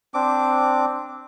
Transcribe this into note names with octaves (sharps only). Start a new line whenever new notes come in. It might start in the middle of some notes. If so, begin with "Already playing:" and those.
C4 D4 D6